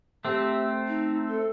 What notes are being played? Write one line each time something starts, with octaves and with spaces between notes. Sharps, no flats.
A3 C4 G4
D#4
A4